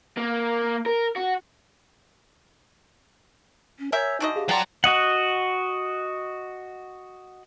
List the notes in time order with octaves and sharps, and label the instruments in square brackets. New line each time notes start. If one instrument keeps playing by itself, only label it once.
[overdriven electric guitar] A#3
A#4
F#4
[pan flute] C#4
[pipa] A#4 E5 [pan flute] C#5 [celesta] G#5 E6 G6
[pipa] D3 F#4 D#5 [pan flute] D#4
[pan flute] G4 [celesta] G#4 F5
[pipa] F3 D5 [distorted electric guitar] F#3 A#5 [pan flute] F#5 [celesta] G5 C6
[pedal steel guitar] F#4 D#5 F#5